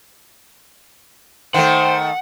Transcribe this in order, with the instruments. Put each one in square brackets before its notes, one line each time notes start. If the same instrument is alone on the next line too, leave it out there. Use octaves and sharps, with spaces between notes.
[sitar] D#3 A3 [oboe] C5 [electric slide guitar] F#5 [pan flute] G5